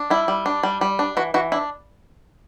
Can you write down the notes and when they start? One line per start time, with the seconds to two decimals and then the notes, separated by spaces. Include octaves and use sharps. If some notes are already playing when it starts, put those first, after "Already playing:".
Already playing: D4
0.10 G3 E4
0.28 G3
0.46 D4
0.63 G3
0.81 G3
0.99 D4
1.17 E3 F#4
1.34 E3 F#4
1.52 D4 E4